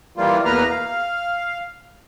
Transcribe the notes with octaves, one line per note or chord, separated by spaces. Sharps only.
E3 G3 A#3 F4
E2 B2 A#3 B4 A#5 F6
F5